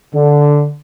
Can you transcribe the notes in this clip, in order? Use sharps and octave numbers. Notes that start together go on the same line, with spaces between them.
D3